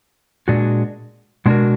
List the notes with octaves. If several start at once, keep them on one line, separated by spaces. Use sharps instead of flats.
A#2 G#3 D4 F#4
B2 G#3 D4 F#4 A#4